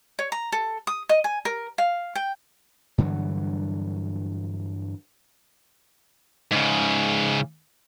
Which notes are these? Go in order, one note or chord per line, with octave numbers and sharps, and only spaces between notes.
C#5
A#5
A4
D#6
D#5
G#5
A#4
F5
G5
G2 D3 E3 F#3
G#2 C#3